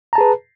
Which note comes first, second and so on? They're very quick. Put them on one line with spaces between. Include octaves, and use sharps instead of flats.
A#5 A5 G#4 B4